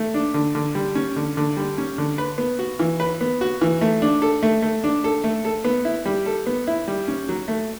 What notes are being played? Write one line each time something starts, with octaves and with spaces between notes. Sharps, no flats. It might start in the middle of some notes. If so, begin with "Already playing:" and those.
Already playing: A3
D4
D3
D3
G3
C#4
D3
D3
G3
C#4
D3
B4
B3
F#4
E3
B4
B3
F#4
E3
A3
D4
A4
A3
A3
D4
A4
A3
A4
B3
E4
G3
A4
B3
E4
G3
C#4
F#3
A3